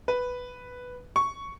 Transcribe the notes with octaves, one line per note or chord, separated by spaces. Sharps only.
B4
C#6